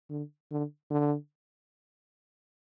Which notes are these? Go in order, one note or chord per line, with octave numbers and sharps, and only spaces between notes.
D3
D3
D3